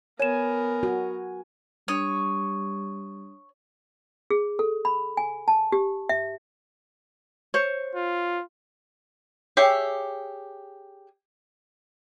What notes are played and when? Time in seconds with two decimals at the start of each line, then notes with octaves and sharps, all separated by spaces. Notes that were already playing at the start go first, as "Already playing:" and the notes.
0.19 B3 A#4 C#5 G#5 E7
0.83 F#4
1.88 G3 D4 C#5 D#6 D#7
4.31 G#4
4.59 A4
4.85 B5
5.17 G#5
5.48 A5
5.72 G4
6.09 E5
7.54 C5 C#5
7.95 F4
9.57 G4 G#4 C#5 E5 G5